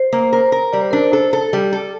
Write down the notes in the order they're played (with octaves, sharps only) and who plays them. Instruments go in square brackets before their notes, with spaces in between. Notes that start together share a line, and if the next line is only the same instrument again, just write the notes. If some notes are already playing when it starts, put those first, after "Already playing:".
Already playing: [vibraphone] C5
[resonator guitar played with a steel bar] A#3
A#4
A#4
[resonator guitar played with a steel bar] G3 [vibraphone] D5
[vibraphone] C5
[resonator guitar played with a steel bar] D4 [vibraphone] A#4
[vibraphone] C5
[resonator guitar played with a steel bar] A4
A4
G3
A4